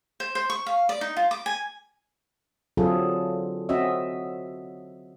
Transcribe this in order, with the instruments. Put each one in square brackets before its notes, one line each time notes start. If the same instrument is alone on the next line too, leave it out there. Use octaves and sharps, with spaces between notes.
[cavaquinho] C5
C5
C#6
F5
D5
D#4
F4
D6
G#5
[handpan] D3 F#3 C4 F4 G#4 A4
C4 C#4 F#4 D#5 E5